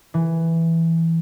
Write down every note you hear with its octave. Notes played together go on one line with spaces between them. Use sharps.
E3